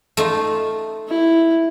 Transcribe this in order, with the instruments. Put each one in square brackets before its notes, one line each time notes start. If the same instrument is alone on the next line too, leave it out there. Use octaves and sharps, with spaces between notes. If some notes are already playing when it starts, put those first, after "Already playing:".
[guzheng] A3 D#4 F4
[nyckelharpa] E4